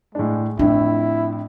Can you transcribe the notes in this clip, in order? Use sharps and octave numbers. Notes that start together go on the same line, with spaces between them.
A2 G#3 D4
F2 A2 D4 E4